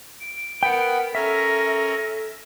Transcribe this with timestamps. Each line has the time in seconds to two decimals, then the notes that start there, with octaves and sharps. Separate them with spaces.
0.21 D7
0.63 B3 A#4 F#5 G5 B5
1.15 C#4 A4 A#4 E5 A#6